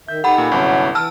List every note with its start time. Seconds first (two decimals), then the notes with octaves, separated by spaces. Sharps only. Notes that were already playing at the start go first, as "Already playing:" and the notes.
0.08 D#3 E5 G6
0.24 D#4 G4 A4 F#5 B5
0.38 A#2
0.52 G1 C2 F#3 C#4 E4
0.95 E3 A5 E6 F6